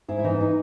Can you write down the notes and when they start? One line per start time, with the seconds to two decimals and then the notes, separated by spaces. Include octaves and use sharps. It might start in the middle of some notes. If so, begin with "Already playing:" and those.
0.08 G#2 E4
0.19 E4
0.24 E3 D#4
0.40 D#4